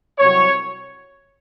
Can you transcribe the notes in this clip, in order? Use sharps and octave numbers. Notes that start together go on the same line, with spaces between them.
C2 C3 F#3 C#5